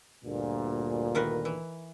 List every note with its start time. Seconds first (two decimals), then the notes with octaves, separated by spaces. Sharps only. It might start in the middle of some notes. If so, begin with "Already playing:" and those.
0.24 D2 G2 A#2
1.15 D#3 A#4 B4
1.45 E3